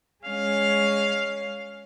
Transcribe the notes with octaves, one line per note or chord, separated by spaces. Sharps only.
G#3 C#4 F5